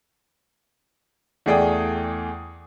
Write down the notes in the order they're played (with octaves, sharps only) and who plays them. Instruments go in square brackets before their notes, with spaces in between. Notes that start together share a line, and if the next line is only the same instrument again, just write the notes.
[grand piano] E2 A3 G#4 D5 G5 D#6